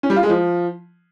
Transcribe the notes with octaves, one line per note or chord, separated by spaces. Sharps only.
C#4
G3
F4
G#3
F3